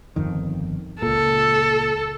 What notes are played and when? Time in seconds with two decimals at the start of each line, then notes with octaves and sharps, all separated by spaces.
0.16 G1 F2 D#3
1.02 C#2 A#2 A4